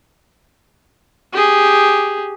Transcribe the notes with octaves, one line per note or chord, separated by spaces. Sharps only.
G4 G#4